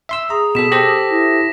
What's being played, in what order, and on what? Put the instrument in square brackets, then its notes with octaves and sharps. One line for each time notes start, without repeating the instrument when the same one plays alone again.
[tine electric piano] E5 C6 E6
[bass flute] G#4 [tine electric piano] A#5 [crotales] D#6
[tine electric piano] B2 A4 [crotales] B6 E7
[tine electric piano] G4 A4 C5 [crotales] A#6
[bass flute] E4